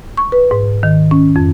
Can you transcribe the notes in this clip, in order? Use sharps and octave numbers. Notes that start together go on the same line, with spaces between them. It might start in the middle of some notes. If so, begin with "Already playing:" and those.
C#6
B4
G#2
D#3
C#4
F2